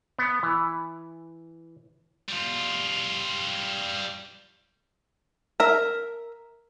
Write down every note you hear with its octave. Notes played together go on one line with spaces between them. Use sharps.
B3
E3
G3 F4
A#4 E5